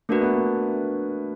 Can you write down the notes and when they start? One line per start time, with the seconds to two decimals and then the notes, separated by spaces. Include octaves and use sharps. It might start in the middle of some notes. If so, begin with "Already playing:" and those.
0.09 A3 A#3 D4 F#4 B4
0.21 B3
0.34 A#3